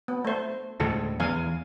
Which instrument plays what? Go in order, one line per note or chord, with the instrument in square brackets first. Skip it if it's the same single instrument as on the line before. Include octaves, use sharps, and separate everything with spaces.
[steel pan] B3
A3 C5
[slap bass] D2 A2 C#3 [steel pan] G#3 A4
[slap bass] E2 E3 [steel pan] F5 G#5